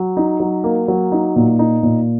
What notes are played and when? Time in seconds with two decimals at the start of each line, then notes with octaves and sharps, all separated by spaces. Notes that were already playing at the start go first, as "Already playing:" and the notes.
Already playing: F#3
0.17 D#4
0.40 F#3
0.64 A#3
0.88 F#3
1.12 D#4
1.36 A#2
1.59 D#4
1.83 A#2